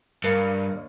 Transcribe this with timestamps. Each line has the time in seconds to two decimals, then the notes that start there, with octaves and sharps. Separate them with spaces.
0.24 G2 A#4 D5 F5
0.71 D#2